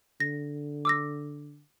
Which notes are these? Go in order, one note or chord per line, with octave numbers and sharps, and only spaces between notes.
D3 A#6
D6 E6 A#6